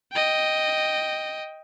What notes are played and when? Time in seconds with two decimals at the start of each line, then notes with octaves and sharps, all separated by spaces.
0.12 D#5 G5